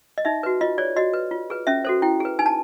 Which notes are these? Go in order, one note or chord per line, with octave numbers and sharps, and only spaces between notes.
D#5
D#4 E5
F#4 B4
F4 D#5
G#4 C#5 D5
F#4 D#5
B4
F4
G#4 B4
C#4 E5
F#4 A4 C5
E4 G5
G#4 B4
D#4 G#5
A5